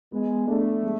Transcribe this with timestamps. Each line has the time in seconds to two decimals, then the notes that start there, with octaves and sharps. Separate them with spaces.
0.12 G#3 B3
0.47 A3 D4
0.83 G#3